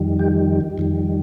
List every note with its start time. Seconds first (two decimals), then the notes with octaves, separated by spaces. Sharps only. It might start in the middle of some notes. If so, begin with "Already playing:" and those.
Already playing: F2 D#3 G3
0.19 G4
0.78 F2 D#3 G3